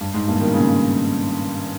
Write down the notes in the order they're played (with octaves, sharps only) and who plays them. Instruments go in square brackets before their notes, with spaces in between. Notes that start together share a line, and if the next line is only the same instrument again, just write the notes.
[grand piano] G2
G#2
G2 A#2
B2 D#3
A#2 C#3